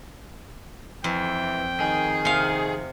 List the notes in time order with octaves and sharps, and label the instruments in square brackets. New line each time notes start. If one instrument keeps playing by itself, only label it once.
[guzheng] F2 [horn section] E3 [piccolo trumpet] G5
[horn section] D#3 [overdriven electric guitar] G#4
[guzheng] C3 F5